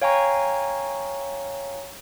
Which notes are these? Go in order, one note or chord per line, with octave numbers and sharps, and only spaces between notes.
C#5 F5 G5 G#5 A#5 C#6